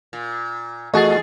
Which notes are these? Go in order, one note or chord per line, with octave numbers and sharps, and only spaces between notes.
A#2
E2 A3 F#4 G#4 D#5 A6